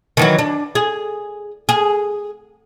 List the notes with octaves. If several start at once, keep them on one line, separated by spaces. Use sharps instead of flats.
D#3 E3 F#3
D4
G#4
G#4